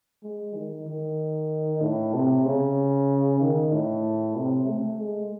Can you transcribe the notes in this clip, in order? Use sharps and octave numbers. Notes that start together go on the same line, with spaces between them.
G#3
D#3
D#3
A2
C3
C#3
D#3
A2
C3
A3
G#3